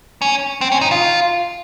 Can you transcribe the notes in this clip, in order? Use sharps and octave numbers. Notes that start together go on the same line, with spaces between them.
C#4
C4
C#4
D#4
F4